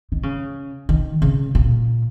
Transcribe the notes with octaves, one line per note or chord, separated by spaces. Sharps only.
D#3
C#3
D#3
C#3
A#2